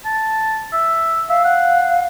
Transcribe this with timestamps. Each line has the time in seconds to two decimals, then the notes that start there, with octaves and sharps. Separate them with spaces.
0.05 A5
0.73 E5
1.29 E5 F5
1.45 F#5